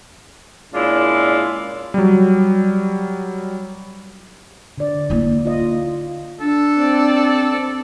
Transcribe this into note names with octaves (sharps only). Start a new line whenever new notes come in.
A#2 G#3 C#4 D4 E4 F4
F#3 G3
D3 D5
A#3 E4
F4 D#5
D4 A4
C4 D5